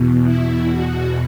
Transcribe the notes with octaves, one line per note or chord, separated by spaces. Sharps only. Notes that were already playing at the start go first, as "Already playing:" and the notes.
Already playing: E2 B2
E4
F#4